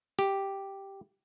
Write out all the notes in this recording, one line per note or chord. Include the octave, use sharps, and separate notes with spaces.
G4